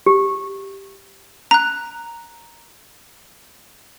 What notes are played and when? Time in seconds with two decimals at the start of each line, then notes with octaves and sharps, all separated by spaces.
0.06 G4
1.51 A#5 F#6